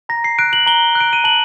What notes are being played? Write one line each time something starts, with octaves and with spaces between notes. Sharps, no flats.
A#5 A#6
C7
F#6 D7
F#7
A#5 G7
F#6
D7
D#7
A5 F#7